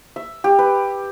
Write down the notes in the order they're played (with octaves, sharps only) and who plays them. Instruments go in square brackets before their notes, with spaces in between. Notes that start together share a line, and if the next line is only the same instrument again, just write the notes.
[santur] E5
G4
B4